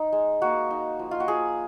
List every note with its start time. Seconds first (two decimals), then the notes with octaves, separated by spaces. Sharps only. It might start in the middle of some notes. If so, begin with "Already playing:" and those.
Already playing: D#4
0.12 G#3
0.42 A#3 F#4
0.70 D#4
0.99 F3
1.11 F4
1.20 F#4
1.28 F3 G#4